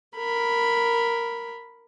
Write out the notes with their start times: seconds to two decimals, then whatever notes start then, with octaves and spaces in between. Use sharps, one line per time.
0.17 A#4 B5